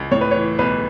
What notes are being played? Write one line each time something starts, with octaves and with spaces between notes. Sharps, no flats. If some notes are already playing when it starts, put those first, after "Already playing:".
Already playing: C#2
A2 C#5
B4
C#5
E3
B1 B4